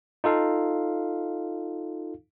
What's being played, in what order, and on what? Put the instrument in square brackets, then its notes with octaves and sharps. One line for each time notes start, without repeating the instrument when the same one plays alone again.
[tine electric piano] D#4 F4 A4 F5